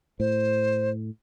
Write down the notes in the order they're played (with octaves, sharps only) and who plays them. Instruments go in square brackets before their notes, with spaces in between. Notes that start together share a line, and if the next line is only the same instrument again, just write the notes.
[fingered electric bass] A2 [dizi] C5